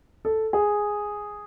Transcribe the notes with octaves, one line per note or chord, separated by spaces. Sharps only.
A4
G#4